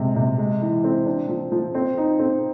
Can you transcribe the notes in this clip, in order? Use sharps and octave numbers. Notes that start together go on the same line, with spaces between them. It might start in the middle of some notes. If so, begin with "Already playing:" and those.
Already playing: C3 G#3
C3
G#3
E3
C4
D4
F3
F3
C4
D#4
C4